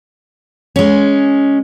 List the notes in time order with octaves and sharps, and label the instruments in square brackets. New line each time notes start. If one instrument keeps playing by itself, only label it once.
[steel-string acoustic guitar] G#3 C#4